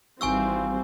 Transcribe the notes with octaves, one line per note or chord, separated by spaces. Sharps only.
G#1 E3 G3 C4 F5 G#5 C#6 E6